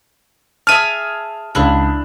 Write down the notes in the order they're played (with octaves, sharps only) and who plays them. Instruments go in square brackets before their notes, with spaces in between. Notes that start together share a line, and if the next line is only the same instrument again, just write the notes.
[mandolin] G#4 E5 A5 [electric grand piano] F6 D#7
[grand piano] C#2 C#3 [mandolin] D4 E4